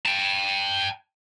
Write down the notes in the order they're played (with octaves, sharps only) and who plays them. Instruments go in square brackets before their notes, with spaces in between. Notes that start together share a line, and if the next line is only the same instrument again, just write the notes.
[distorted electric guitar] G5 A5